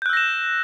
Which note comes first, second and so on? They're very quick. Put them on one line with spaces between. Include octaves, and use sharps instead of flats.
G6 F#6 E6 A#6 E7